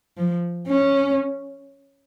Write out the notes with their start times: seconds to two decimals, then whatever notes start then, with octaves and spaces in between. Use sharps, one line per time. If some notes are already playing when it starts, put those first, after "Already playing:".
0.17 F3
0.67 C#4